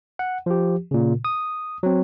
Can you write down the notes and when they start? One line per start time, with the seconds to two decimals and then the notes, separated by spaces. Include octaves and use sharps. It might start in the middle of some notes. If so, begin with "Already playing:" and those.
0.19 F#5
0.46 F3 G4
0.91 A#2 C#3
1.25 D#6
1.83 F#3 C4